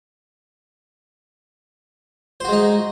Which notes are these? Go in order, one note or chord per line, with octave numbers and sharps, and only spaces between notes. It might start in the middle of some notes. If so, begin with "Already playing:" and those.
G#3 D#4 F#4 C5